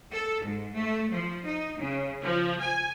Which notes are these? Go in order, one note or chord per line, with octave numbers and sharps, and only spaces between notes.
A4
G#2
A3
F3
D#4
C#3
F3
G#5